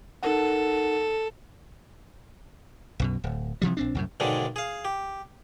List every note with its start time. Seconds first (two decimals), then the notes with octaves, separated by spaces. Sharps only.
0.23 D#4 A4 A#4 F#5
3.00 B1 F#2 B2
3.24 D1
3.62 C3 E3 F3 G3
3.77 A#1 C4 D4
3.95 C2 F#2 A2
4.20 B1 G#2 D3 D#3 G#3 D4
4.56 G#4 F5
4.85 G4